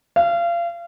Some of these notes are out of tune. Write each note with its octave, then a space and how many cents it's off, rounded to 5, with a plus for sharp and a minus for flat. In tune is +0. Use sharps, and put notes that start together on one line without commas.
F5 -30